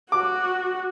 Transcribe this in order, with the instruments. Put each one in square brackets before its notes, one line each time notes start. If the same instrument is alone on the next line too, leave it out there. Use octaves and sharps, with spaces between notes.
[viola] F#4 [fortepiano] D6